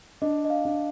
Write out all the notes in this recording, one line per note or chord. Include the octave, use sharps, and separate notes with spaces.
D4 D#5
D#5
F5
D4